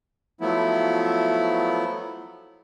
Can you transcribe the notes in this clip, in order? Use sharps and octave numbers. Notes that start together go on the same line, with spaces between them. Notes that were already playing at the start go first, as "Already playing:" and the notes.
F3 F#3 A3 B3 E4